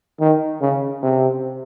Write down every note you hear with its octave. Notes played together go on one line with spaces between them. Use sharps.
D#3
C#3
C3